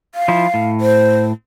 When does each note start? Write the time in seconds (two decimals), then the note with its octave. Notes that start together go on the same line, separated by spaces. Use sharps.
0.15 F5
0.28 F3 E4
0.54 A2
0.81 C5